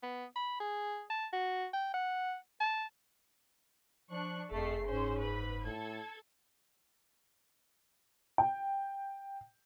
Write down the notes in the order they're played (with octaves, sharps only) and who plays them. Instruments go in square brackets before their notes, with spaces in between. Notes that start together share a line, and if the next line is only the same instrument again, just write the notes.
[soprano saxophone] B3
B5
G#4
A5
F#4
G5
F#5
A5
[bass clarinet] F3 [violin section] D4 C#6 F#6
[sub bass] F#1 [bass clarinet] F2 [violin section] A3 A4 C7 [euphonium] G#4
[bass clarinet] G#2 [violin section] C#4 C5
[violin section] B4 B5
[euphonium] A2 [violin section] A4 G#6
[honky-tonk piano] G5